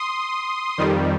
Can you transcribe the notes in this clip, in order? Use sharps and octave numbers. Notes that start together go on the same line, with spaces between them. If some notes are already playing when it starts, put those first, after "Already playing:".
Already playing: C6 D#6
F2 D#3 G3